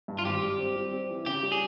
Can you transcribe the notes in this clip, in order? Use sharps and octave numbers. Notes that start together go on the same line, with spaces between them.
G2
F4
G#1 G4
G3
C4
G3
C4
E3
C#3 G4
G3
G#4